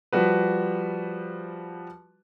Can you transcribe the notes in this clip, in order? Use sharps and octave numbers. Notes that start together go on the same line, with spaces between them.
F3 G3 F#4 B4